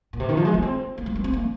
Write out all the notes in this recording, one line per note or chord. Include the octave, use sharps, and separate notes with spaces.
A#2
C3
D#3
F3
G#3
A#3
C4
A#3
G#3
A#3
C4
A#3